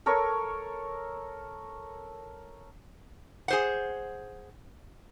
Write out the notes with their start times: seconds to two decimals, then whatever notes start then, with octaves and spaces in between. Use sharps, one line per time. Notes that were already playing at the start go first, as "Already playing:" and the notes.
0.06 A4 A#4 C#5 C#6
3.48 G#4 C5 F#5